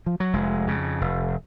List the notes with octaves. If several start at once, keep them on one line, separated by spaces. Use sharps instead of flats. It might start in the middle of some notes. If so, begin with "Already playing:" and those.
F3
F#3
F1 G#3
F2 C#3
F1